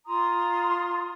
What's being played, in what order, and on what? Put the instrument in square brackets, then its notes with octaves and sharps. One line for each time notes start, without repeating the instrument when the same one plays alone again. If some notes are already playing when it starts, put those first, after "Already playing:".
[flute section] F4 A#5 C6 D#6